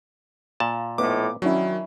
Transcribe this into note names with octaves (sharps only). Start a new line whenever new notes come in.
A#2 A5
A2 F3 B3 D#4 D6
D#3 F#3 C#4 D4 E4